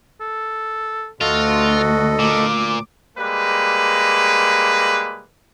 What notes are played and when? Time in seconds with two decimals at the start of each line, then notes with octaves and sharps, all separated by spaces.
0.21 A4
1.21 D2 F4 F#4 A4 D#5
2.19 A#2 D6
3.18 G3 G#3 A#3 B4